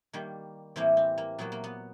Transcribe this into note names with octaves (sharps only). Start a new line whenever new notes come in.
D#3 G3 A#3
A2 E3 G3 A#3 C4
C4
A#3
A#2 F#3 A#3 B3
A#3
B3